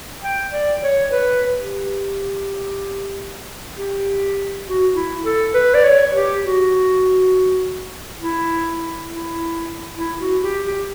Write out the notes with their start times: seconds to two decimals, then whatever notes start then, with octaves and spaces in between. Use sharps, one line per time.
0.23 G5
0.52 D5
0.82 C#5
1.12 B4
1.56 G4
3.77 G4
4.66 F#4
4.95 E4
5.25 A4
5.55 B4
5.74 D5
5.84 C#5
6.14 G4
6.44 F#4
8.20 E4
9.09 E4
9.97 E4
10.19 F#4
10.41 G4
10.64 G4